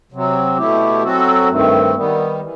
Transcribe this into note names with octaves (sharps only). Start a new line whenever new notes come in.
C3 F#3 C4
B2 A3 E4 G4
F#3 C4 F#4 A4
G2 D#3 A3 C4
D#3 G3 B3
E3